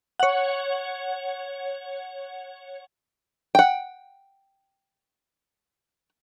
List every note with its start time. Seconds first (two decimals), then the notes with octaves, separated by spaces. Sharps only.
0.20 C#5 F#5
3.55 F#5 G5